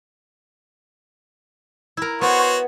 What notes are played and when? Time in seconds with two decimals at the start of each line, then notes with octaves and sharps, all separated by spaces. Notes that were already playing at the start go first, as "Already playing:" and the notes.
1.97 E4 A#4
2.21 B3 F#4 C5 C#5